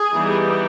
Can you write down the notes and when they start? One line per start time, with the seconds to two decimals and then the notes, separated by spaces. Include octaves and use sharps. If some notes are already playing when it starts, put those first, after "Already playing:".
Already playing: G#4
0.14 E3 G3 B3 D#4